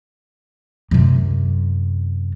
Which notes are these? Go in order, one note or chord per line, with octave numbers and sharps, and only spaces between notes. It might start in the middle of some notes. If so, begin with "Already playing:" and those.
F#2 C3